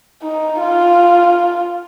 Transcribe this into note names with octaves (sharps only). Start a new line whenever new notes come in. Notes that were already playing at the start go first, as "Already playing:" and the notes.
D#4
F4